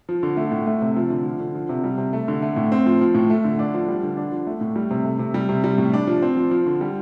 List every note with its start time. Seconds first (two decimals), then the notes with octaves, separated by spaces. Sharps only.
0.09 F3
0.23 D3
0.37 A3
0.52 A2
0.67 A3
0.82 C3
0.96 F3
1.10 D3
1.25 F3
1.40 D3
1.55 F3
1.69 C3
1.84 G3
1.98 C3
2.13 A3
2.28 D3
2.42 A3
2.56 A2
2.72 C4
2.86 F3
3.01 F3
3.15 A2
3.30 A3
3.44 D3
3.59 D4
3.74 F3
3.88 G3
4.03 D3
4.17 D4
4.32 F3
4.47 A3
4.61 A2
4.76 G3
4.91 C3
5.05 A3
5.19 C3
5.34 G3
5.49 C3
5.64 G3
5.78 A2
5.94 D4
6.07 F3
6.22 C4
6.37 F3
6.51 F3
6.66 D3
6.81 G3